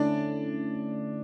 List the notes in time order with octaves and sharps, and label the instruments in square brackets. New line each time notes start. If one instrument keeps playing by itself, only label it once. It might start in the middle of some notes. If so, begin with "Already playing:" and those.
Already playing: [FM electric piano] D3 A3 C#4 E4 [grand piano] D4 D5